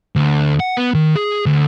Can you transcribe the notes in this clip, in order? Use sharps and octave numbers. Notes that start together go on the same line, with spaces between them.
D2
F#5
B3
D#3
G#4
D2